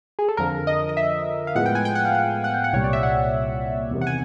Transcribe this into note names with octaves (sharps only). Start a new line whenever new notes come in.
G#4
A4
F2 D3 F3 A#4
D#5
D#5
E5
F5
A2 F3 G#3 B3 F#5
G5
G#5
G5
F#5
F5
F#5
F#5
G5
F#5
C2 A#2 G3 C#5
D5
E5
F#5
E2 C3 D#3
F#5
G#5